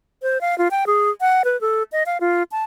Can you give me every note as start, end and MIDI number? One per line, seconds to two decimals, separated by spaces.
0.22 0.41 72
0.41 0.57 77
0.58 0.68 65
0.71 0.84 79
0.87 1.10 68
1.21 1.43 78
1.45 1.59 71
1.61 1.83 69
1.92 2.03 75
2.06 2.18 77
2.21 2.43 65
2.52 2.64 81